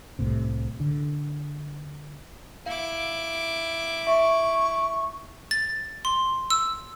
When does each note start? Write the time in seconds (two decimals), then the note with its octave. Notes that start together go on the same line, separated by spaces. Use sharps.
0.19 C2 A2 C3
0.80 D3
2.66 E4 F5 D6
4.07 E5 C#6
5.51 A6
6.05 C6
6.50 E6